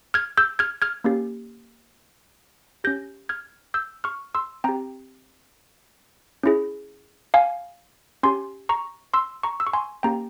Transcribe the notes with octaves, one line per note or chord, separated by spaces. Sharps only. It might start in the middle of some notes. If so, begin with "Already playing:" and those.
F6 G#6
E6 G6
F6 G#6
F6 G#6
A#3 C#4 G4
C#4 G4 G6 A#6
F6 G#6
E6 G6
C#6 F6
C6 E6
C4 G4 G5 A#5
C#4 E4 G#4
F5 G#5
C#4 G4 G#5 C6
A#5 C#6
C6 E6
A#5 C#6
E6
C#6
G#5 C6
A#3 C#4 G4 G5 A#5